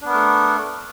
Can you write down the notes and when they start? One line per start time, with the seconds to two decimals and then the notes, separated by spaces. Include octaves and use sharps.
0.01 D4
0.05 B3
0.09 A#4
0.14 A3